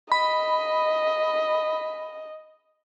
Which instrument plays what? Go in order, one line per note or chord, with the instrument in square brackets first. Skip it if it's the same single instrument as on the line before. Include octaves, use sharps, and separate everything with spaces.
[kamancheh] D#5 [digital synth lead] B5